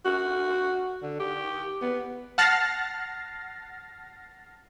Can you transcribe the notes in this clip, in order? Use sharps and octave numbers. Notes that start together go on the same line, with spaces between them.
F#4
D3
G4
B3
F#5 A5 F6 A6 A#6 C7